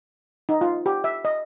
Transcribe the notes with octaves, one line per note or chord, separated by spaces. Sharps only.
D#4
F4
G4
E5
D#5